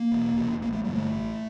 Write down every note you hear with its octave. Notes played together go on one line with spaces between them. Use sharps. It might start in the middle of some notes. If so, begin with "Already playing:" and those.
Already playing: A#3
E1
E2 C3
A1 A#3
A3
G2 D3 G3
A3
A1